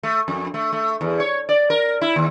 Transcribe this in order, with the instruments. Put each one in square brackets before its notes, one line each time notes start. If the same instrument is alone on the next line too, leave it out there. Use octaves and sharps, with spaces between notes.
[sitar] A3
F2
A3
A3
E2
C#5
D5
A#4
E4
D#2